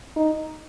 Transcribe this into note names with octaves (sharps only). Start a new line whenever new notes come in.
D#4